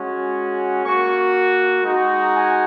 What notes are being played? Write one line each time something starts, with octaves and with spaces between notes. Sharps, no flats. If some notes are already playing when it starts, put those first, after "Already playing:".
Already playing: G#3 C#4 F#4
A#3 F#4 C#6
G#3 D#4 F#4 A#5
G#5